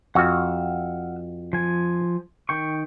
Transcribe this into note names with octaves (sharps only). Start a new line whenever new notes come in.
F2 F#4 F#5 E6 F6
F3 G#5
D#3 G5 C#6